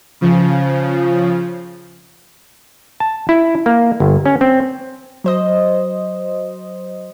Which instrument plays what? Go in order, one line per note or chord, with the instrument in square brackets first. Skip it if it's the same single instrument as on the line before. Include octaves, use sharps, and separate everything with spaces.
[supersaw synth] C#3 F3
[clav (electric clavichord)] A5
E4
A#3
G1
C#4
C4
[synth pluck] F#3 C5 D#5